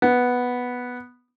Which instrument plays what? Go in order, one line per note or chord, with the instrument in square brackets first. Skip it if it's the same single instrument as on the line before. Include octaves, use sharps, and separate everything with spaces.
[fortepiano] B3